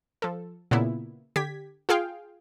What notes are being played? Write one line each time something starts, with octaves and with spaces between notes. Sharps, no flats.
F3 A4
A#2 C#3 B3 E4
D3 G4 G#6 B6
F4 G#4 F5 G5